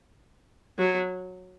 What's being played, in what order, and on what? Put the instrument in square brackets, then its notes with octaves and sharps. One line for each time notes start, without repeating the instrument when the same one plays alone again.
[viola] F#3